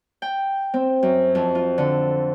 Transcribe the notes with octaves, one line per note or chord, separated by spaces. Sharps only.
G5
C4
F#2
F2
F4
D3